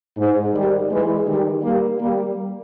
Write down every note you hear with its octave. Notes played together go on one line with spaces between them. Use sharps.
G#2
D#3 G3
E3 G#3
D#3 G3
G3 A#3
G3 A#3